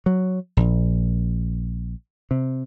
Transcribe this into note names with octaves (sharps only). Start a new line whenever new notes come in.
F#3
A#1
C3